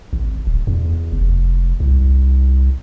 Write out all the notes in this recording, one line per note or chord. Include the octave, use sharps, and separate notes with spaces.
G#1
D1
E2
F1
C2